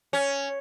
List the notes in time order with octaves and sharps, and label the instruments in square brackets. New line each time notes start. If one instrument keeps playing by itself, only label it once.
[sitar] C#4